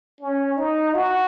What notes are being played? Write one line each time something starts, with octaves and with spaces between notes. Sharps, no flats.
C#4
D#4
F#4